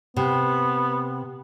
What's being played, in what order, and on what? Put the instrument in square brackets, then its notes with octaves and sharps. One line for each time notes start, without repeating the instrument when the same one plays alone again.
[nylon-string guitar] C3 [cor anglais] B3